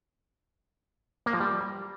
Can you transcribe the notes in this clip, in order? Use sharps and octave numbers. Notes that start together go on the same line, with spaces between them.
A#3
F3
G3